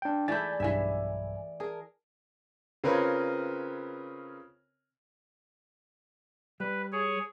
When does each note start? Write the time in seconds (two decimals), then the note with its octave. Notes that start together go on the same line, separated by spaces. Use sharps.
0.02 D4 G5
0.28 E3 A3 E4 G#4 D5 G#5 G6 A6
0.60 B1 G2 E3 E5 G#5
1.60 G#4 A#4 A5
2.84 C#3 C4 F4 A#4 B4 C#5
6.60 G3 B4
6.92 G#4 C#5